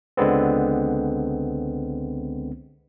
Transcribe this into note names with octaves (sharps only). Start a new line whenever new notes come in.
C#2 D3 G#3 B3 C4